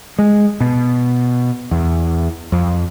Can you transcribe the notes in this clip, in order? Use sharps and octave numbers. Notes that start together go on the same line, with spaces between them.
G#3
B2
E2
F2